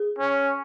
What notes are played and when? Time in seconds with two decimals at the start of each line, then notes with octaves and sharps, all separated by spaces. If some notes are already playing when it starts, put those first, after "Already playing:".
Already playing: G#4
0.19 C#4